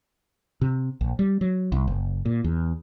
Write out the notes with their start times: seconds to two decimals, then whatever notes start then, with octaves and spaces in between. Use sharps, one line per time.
0.61 C3
1.01 A#1
1.19 G3
1.41 F#3
1.72 C2
1.88 F#1
2.25 A#2
2.44 E2